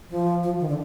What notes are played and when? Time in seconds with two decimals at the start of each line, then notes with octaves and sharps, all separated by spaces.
0.10 F3
0.43 F3
0.60 D#3
0.68 D3